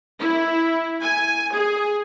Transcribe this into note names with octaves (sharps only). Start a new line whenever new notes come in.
E4
G#5
G#4